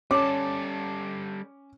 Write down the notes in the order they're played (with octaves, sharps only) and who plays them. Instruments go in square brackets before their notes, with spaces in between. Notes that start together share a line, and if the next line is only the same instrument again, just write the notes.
[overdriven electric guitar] G3 A4 [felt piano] C#4 [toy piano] C#5 [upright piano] D6